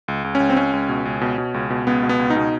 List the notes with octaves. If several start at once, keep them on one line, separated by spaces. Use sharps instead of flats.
C#2
C#2
C#4
C#2
C4
C#2 C#4
C#2
B2
C#2
B2
B2
C#2
B2
C#2 B3
B2
B3
C#2
D#4
B2